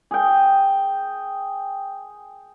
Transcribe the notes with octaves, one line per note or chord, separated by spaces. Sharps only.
G#4 G5